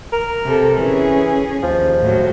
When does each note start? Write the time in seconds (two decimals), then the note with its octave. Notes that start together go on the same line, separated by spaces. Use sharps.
0.12 A#4
0.44 C3 A4
0.79 E3 C#4 G#4
1.63 D#2 F3
2.01 A2 F#3